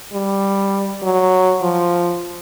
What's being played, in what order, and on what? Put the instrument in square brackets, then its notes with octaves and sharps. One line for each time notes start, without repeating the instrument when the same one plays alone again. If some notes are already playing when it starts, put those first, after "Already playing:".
[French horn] G3
F#3
F3